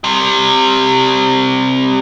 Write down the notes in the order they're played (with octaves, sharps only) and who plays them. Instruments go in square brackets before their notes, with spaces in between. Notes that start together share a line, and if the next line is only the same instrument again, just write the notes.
[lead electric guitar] C3 G3